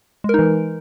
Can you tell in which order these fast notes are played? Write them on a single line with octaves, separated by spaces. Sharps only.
G#3 A#4 D#4 E3